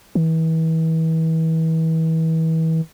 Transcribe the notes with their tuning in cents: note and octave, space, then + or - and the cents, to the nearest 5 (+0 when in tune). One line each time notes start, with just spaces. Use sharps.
E3 -35